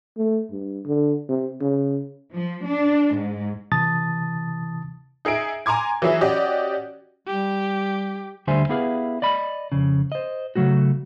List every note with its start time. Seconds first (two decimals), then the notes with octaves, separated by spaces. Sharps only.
0.17 A3
0.51 G2
0.86 D3
1.29 C3
1.61 C#3
2.34 F3
2.66 D4
3.14 G#2
3.72 C3 E3 A5 D#6 A6
5.25 D#4 G#4 E5 D7
5.66 G#5 A#5 C6 D6 G#6
6.02 E3 F#3 E4 G#4 E5
6.21 C#4 F#4 G4 D5 D#5
7.27 G3 G4
8.47 D2 D3 G3 C5 E5 G#5
8.69 B3 E4 G4 G#4 B4 F5
9.22 D5 D#5 B5
9.72 F2 C#3
10.12 C5 D#5
10.56 C#3 F#3 A3 F#4